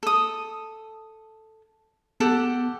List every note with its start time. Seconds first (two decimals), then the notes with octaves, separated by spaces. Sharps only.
0.03 A4 D#6
2.20 B3 G4 A4 F#5